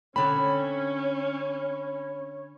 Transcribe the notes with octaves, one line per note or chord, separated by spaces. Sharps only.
D3 C4 C#4 C#5 B5